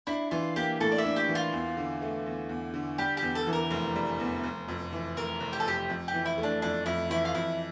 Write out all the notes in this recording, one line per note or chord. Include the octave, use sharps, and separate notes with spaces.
D4 E4
E3 F4
A#3 G4
A2 A4
D5
E5
D4
G4
E3
F4
E2
D3
A3
E2
E2
D3
G3 G4
G4
E2
A4
E3
A#4
F1
G3
E2
F1
F2
E3
F1 A#4
F1
G4
A4
F2 G4
F2
G4
E3
E4
A3
D4
F2 D4
F2 E4
E3 E4
F4
F2 E4